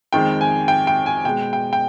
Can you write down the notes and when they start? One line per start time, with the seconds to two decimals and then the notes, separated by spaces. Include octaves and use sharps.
0.13 F2 D#3 G#3 G5
0.41 G#5
0.68 G5
0.87 G5
1.06 G#5
1.25 B2 G#3 G5
1.53 G5
1.73 G5